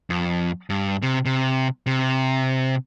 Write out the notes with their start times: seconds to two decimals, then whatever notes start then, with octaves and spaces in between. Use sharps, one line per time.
0.10 F2
0.70 G2
1.02 C3
1.25 C3
1.87 C3